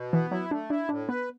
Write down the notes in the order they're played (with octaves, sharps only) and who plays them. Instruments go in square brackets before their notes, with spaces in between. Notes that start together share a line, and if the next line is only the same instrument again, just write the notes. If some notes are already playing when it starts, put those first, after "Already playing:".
Already playing: [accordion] B2
[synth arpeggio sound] E3 [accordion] B3
[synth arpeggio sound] F#3 [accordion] E4
[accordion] A3 [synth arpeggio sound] D4
[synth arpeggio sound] D4 [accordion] E4
[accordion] A2 [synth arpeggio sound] D4
[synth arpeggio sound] B3 [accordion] B4